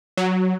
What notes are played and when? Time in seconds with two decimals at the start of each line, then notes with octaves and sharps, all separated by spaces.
0.17 F#3